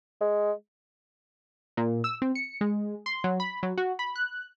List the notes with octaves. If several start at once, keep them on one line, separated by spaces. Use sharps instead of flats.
G#3
A#2
E6
C4
C#7
G#3
C6
F#3
B5
F#3
F#4
B5
F#6